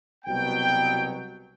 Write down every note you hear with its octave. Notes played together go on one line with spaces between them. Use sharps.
C2 B2 F#3 B3 G5